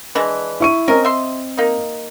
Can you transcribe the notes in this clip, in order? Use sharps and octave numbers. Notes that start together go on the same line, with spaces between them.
E3 G#3 D4
E4 C#6 D#7
C4 C#4 A#4 D#5
E5 C6
A#3 D#4